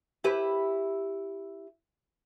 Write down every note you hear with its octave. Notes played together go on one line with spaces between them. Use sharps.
E4 G4 B4